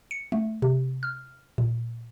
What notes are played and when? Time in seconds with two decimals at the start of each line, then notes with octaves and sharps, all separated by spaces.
0.11 C#7
0.32 A3
0.62 C3
1.03 F6
1.58 A#2